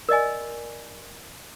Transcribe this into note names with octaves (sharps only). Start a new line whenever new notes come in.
A#4 D5 D#5 G#5